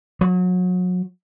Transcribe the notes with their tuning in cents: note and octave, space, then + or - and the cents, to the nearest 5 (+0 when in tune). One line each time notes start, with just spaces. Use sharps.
F#3 -30